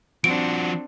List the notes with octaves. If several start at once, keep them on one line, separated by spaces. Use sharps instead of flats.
F3 C4 D4 F#4 D7